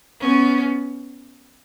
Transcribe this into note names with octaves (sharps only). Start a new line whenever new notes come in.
B3 C#4